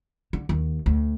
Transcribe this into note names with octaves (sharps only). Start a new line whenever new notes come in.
D3
D#2
D2